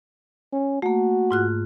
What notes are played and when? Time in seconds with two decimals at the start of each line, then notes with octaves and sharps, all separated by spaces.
0.53 C#4
0.82 A3 A#3 F#4
1.31 G#2 F4 F#6